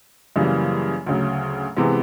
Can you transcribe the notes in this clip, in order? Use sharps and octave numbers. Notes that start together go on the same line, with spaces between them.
F#2 C#3 E3 G3 A#3
D2 C#3 F#3
C3 E3 G#3 B3